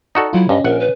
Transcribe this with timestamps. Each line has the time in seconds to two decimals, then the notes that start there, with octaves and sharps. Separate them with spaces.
0.15 D#4 F#4 A4 D5
0.33 F#3 E4 F4
0.49 G2 C#4 D#5
0.64 A#1 A#4 F#5
0.80 B4